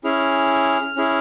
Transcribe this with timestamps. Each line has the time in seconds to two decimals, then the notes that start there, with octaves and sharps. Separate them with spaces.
0.04 C#4 E4 G#4 F6
0.96 C#4 E4 G#4